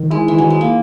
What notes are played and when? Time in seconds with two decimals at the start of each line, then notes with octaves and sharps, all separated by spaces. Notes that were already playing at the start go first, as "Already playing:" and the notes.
Already playing: D#3
0.10 G#3 E4
0.28 E3
0.38 D#3 F#3
0.50 G#3
0.61 A#3